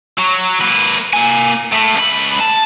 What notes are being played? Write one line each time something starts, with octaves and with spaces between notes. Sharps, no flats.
F#3
A#3 B4
A#3 G#5
A2
C#2 B5
A5